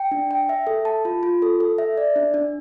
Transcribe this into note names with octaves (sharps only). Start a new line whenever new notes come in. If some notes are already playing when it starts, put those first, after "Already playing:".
Already playing: G5
D4
G5
E5
A4
A5
F4
F4
A4
A4
E5
D5
D4
D4